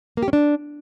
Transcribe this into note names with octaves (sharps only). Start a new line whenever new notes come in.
A#3
G4
C#4
D4